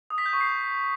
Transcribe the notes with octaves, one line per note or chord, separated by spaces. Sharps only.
D#6
B6
G6
C#6
C7